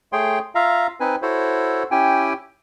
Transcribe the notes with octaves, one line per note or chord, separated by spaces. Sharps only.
A3 G#4 C#5 G5 C6
F4 E5 F5 A#5
C4 D#4 B4 G#5
E4 F#4 A4 C5 C#5
C#4 E4 G4 G5 G#5